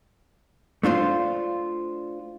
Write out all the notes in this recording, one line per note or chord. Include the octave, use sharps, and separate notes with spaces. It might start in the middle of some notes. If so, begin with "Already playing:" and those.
A3 D4 F4 C5